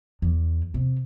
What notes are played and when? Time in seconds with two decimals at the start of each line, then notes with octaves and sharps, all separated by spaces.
0.22 E2
0.74 C3